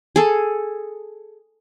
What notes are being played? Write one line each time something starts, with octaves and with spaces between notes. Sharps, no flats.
G#4 A4